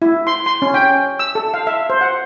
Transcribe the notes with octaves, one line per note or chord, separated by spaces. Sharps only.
E4
C6
C6
C#4
G5
E6
A4
F5
E5
C5
F#5